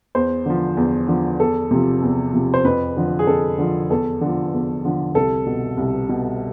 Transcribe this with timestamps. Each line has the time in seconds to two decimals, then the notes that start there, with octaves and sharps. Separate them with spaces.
0.15 E2 C5
0.46 D3 F3
0.77 E2
1.08 D3 F3
1.40 E2 A4
1.71 C3 F3
2.03 E2
2.33 C3 F3
2.54 C5
2.65 F2 B4
2.97 D3 F3
3.19 G#4
3.27 F2 A4
3.58 D3 F3
3.90 E2 A4
4.21 D3 F3
4.53 E2
4.85 D3 F3
5.15 C2 A4
5.46 B2
5.77 C2
6.09 B2